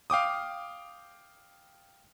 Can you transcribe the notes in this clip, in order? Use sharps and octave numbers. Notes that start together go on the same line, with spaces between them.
F5 G5 D6 D#6